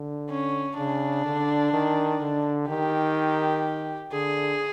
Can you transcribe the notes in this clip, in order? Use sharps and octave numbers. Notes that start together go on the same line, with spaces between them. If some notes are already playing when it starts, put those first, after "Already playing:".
Already playing: D3
C#4
C#3 D4
D3
D#3
D3
D#3 G4
D3 G#4